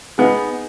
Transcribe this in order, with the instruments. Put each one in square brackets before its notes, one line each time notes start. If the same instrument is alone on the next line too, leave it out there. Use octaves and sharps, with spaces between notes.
[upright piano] B3 [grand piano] D#4 G#4